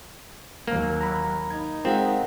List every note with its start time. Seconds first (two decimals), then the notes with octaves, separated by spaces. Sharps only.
0.67 D#2 F#3 A#3
1.01 A#5 B5
1.51 D#4 G#6
1.85 G#3 C4 F4 A#4 F5 F#5